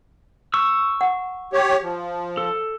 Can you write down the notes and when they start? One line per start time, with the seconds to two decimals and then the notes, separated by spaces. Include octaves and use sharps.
0.54 C#6 E6
1.01 F#5
1.53 G4 C#5
1.82 F3
2.37 A4